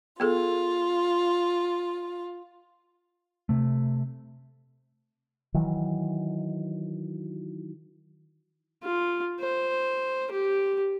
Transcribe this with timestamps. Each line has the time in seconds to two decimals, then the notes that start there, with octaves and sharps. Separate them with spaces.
0.20 B3 F4 G#4 A4
3.49 C3 A3
5.54 D#3 E3 F#3
8.84 F4
9.40 C5
10.31 G4